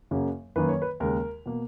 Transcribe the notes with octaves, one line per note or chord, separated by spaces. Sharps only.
F#2 C#3 F#3 A#3
F#2 D#3 A#3 B4
C#5
B4
D#2 C#3 G#3 A#4
B2 A#3